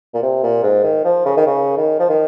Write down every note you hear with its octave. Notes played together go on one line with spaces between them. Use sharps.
A#2
C3
A#2
G#2
D#3
F3
C#3
D#3
C#3
D#3
F3
D#3